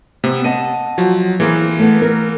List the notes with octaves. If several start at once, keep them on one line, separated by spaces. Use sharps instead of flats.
C3 B3
D#5 F#5 A5 D#7
F3 F#3
E3 A#3 C4 G#4
A3 B3
A#4